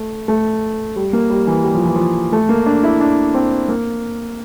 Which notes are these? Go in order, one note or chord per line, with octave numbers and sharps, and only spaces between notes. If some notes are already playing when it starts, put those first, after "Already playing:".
Already playing: A3
A3
G3
A#3
G3
E3
G3
F3
E3
F3
A3
A#3
D4
E4
D4
C4
A#3